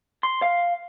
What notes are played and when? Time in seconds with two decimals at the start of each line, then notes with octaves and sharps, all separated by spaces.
0.23 C6
0.42 F5